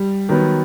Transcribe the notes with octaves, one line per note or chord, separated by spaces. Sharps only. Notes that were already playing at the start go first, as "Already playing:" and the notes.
Already playing: G3
D#3 F#3 B3